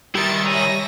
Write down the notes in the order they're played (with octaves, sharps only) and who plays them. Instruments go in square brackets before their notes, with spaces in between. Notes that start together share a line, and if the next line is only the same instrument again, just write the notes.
[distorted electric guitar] D#3 E4 [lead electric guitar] G3 [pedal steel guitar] G4 E5 [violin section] C6 A6 C#7
[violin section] C#5 E5 A#6 [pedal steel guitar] G#5 A#5